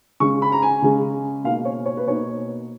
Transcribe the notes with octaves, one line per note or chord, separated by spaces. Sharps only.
C#3 G#3 C#4 C#6
B5
A#5
G#5
C#3 G#3 C#4
B2 A#3 D#4 F5
C#5
C#5
B4
B2 A#3 D#4 C#5